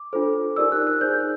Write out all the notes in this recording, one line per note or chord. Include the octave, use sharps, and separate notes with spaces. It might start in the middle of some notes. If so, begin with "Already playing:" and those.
Already playing: D6
D4 F4 A4 C5
D#4 G4 A#4 D5 E6
F#6
F#6
D#4 G#4 C5 G6